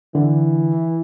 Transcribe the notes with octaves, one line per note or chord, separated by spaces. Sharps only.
D3 E3